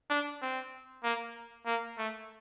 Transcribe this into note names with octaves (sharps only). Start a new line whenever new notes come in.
D4
C4
A#3
A#3
A3